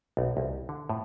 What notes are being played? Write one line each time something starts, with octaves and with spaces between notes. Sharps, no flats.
B1
C2
D3
A2